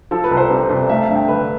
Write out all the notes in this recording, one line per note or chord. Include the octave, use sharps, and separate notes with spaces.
F3 A4
B4
C2
C5
C3
C2
A3 E5
F5
G2
G5
D3 B4